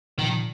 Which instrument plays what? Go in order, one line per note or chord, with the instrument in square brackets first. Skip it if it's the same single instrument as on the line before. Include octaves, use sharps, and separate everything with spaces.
[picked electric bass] A#2 F3 [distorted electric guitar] D#3